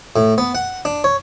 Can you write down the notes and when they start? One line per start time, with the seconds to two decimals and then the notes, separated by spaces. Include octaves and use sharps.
0.16 A2
0.38 B3
0.55 F#5
0.85 D4
1.04 C#5